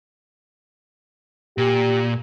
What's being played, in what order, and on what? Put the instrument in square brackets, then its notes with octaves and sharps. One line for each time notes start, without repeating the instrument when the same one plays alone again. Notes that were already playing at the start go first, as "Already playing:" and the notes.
[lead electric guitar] A#2 [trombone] G4